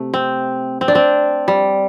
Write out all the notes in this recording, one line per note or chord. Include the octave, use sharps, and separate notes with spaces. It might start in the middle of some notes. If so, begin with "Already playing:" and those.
Already playing: C3 A3
C4
C4
D4
C4
G3